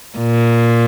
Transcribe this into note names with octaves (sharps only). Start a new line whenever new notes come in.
A#2